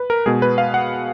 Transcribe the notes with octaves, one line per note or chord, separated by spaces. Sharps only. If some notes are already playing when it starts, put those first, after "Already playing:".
Already playing: B4
A#4
B2 G#3 G#4
B4
F5
F#5